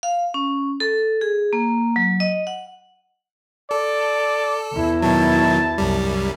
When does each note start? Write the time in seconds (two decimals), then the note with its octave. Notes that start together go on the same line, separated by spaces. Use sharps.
0.03 F5
0.34 C#4
0.80 A4
1.21 G#4
1.53 A#3
1.96 F#3
2.20 D#5
2.47 F#5
3.71 A4 D5
4.72 E2 E4
5.02 B2 D#3 F#3 A5
5.78 C2 F#2 G3